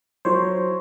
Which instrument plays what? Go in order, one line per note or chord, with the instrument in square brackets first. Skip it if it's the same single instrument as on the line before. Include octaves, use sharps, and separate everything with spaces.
[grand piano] F#3 E4 [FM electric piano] C5 C#5